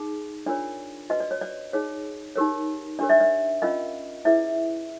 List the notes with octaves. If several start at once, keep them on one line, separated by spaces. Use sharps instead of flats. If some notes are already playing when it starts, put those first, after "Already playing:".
Already playing: D#4 G#4
D4 F4 A#4 C#5 D5
F#4 B4 D#5
D5
C#5
D5
D#4 G#4 C#5
D#4 G4 A#4 C#5
D4 G4 A#4 C#5 D5
D5 E5
D5 E5
C#4 F4 A#4 D#5 F5
E4 G#4 B4 D5 E5